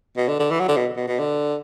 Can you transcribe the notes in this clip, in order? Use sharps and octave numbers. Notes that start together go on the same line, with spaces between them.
B2
D3
D3
E3
F#3
D3
B2
B2
B2
D3